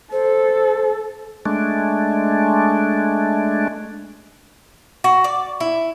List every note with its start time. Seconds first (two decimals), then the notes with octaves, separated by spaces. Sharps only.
0.12 A4 C5
1.46 G#3 A3 D4
5.04 F#4
5.24 D5
5.60 E4